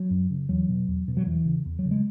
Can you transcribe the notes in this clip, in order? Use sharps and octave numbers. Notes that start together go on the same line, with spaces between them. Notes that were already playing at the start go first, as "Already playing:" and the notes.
Already playing: F#3
F#2
C#3
E2 F#3
B2
E2
B2
F#3
E2 E3
C#3
E2
F#3
C#3
G#3